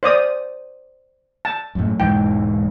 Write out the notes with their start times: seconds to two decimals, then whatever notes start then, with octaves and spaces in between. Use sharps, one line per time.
0.03 C5 D5 D#6
1.45 A5
1.75 F#2 A2
2.00 E1 G#2 E3 G5